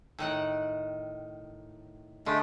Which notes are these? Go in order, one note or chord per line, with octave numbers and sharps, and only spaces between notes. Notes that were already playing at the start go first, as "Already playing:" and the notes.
A2 D#3 F#5
D3 G#3 A3